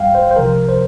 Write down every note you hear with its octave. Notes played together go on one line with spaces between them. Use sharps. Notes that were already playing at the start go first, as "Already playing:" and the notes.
Already playing: G2 G3 F5 G5
C5
C5
C2 C3 F3 A#4
C5